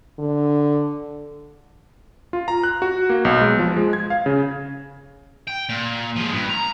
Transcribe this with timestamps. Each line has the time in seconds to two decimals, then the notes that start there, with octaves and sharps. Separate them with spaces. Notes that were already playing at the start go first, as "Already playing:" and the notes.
0.19 D3
2.33 F4
2.48 A#5
2.64 F#6
2.82 F#4
3.10 A#3
3.25 B1
3.41 G#3
3.59 F3
3.76 G#3
3.93 G#6
4.10 F5
4.26 C#3
5.47 G5
5.69 A#2
6.16 F3 G#3
6.33 G2
6.50 A#5